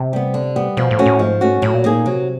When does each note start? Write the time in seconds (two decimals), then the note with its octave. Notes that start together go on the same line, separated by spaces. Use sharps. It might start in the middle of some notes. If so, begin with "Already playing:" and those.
Already playing: C3
0.13 G3 B3
0.34 D3
0.56 G3 B3
0.77 B2 F3
0.91 A2
0.99 A3 C#4 F#4
1.06 A2
1.19 G#2 F3
1.41 A3 C#4 F#4
1.62 A2 F#3
1.74 A#2
1.84 A2 A#3 D#4 G#4
1.94 A#2
2.06 C3 F#3